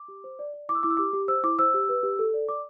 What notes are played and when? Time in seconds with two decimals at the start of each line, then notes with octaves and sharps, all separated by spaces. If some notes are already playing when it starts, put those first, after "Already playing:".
Already playing: D6
0.08 G4
0.24 C5
0.39 D5
0.54 D5
0.69 E4 D6
0.75 E6
0.83 E4 D6
0.90 E6
0.97 G4 D6
1.13 G4
1.28 C5 E6
1.44 E4 D6
1.59 C5 E6
1.74 G4
1.89 B4
2.03 G4
2.19 A4
2.34 D5
2.48 D5 D6